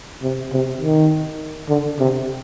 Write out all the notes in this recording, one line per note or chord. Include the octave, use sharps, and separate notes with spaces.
C3
C3
D#3
D3
C3